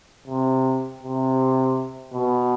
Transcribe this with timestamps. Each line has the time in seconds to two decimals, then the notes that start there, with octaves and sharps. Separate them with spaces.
0.28 C3
1.03 C3
2.13 B2